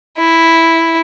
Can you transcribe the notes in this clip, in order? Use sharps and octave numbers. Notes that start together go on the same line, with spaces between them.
E4